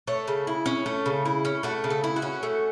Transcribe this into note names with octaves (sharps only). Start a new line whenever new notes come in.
A3 C#5
C#3
E4
C#4
A3
C#3
E4
C#4
A3 F#4
C#3
A4
E4
F#4
C#4
A3